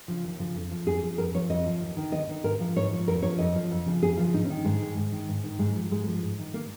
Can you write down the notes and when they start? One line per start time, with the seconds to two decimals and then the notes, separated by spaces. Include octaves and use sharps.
0.08 C#3 F3
0.24 D#2
0.40 C#3 F3
0.56 F2
0.71 F3
0.86 F2 G#4
1.02 F3
1.18 F2 A#4
1.34 F3 C#5
1.50 F2 D#5
1.66 F3
1.81 D#2
1.96 D#3
2.12 D#2 D#5
2.29 D#3
2.44 G#2 A#4
2.60 F3
2.76 G#2 C#5
2.91 F3
3.07 F2 A#4
3.22 F3 C#5
3.38 F2 D#5
3.55 F3
3.71 F2
3.86 C#3 F3
4.02 F2 G#4
4.17 C#3 F3 F4
4.34 G#2 D#4
4.44 C#4
4.50 D#3
4.64 G#2 G#3
4.80 D#3
4.96 G#2
5.12 D#3
5.29 G#2
5.44 D#3
5.59 G#2 G#3
5.75 F3
5.91 G#2 G#3
6.07 F3
6.22 G#2
6.39 D#3
6.54 A#3